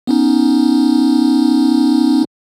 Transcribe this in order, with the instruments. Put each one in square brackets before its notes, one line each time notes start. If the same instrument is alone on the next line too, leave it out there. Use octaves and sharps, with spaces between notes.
[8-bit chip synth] B3 C#4 D#4